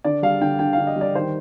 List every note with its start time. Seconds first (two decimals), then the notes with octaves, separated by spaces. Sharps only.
0.04 D3 D5
0.23 G3 F5
0.41 D3 G5
0.59 D3 G5
0.73 F5
0.78 D3
0.87 D#5
0.96 G3
1.01 D5
1.15 D#3 C5